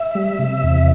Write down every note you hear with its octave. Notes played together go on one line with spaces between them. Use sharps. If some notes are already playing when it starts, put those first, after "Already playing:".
Already playing: E5
G3
C3
E2